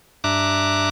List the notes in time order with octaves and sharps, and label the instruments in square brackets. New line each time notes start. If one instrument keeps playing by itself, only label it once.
[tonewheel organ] G2 D4 E5 A#5 D6 F#6